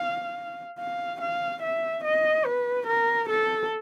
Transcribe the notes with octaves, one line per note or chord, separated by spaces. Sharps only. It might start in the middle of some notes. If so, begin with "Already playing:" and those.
Already playing: F5
F5
F5
E5
D#5
B4
A#4
A4